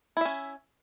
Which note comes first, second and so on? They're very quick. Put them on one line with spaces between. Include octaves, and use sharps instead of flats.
E4 E5 C#4